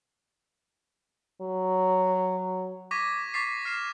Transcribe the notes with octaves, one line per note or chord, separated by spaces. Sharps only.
F#3
C#6 D6 G#6 A#6 B6 D#7
C#6 D6 A6 B6 C7
F6 C7 E7